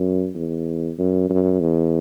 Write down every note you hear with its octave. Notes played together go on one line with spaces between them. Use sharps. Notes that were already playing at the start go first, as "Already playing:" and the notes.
Already playing: F#2
E2
F#2
F#2
E2